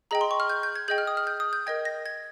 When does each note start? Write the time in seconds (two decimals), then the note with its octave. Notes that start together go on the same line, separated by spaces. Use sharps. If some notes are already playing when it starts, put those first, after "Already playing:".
0.11 G#4 D#5 G5 A#5
0.21 C6
0.31 C#6
0.40 F6
0.50 G6
0.63 G6
0.76 G#6
0.88 G#4 D#5 G5 G6
0.98 F6
1.07 D#6
1.17 F6
1.27 G6
1.40 D#6
1.53 G6
1.66 A#4 D#5 G5 G#6
1.85 A#6
2.06 G#6